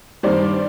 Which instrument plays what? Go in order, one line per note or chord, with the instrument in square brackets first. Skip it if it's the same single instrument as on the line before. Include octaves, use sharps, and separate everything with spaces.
[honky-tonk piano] G2 D#3 G3 C5 D5